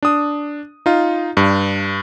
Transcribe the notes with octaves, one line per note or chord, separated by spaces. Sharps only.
D4 D#6
D#4 F4
G2